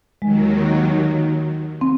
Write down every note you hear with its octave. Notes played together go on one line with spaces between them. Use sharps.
D#2 D#3 F#3 G#3
C4